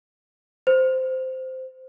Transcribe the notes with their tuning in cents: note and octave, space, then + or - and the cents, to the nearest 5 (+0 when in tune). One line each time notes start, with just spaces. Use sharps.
C5 -10